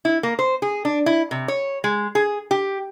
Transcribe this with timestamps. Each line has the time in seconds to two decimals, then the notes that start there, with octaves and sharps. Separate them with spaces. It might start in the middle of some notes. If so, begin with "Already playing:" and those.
0.05 E4
0.23 A#3
0.39 C5
0.62 G#4
0.85 D4
1.06 E4
1.31 C3
1.48 C#5
1.84 G#3
2.15 G#4
2.51 G4